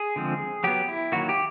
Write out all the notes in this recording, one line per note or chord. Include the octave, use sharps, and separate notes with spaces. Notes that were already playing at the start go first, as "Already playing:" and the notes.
Already playing: G#4
D3 F3 G#3 C4
F#3 B3 G4
E4
D#3 F#3 A#3 F#4
G4